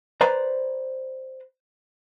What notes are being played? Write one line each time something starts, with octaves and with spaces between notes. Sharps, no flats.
B4 C5 D5 A#5